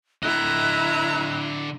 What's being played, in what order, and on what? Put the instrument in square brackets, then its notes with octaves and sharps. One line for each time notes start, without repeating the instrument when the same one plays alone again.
[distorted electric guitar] D3 D#5 [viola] E4 A#5 [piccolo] F#6